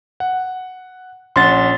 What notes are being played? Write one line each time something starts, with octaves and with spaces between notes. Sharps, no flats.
F#5
A#1 C#4 F#5 C6 A6